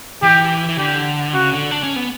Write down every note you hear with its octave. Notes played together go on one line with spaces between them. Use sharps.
E3 G4
E3
D3 G4
C#3 F#4
D3
D4
C#4
B3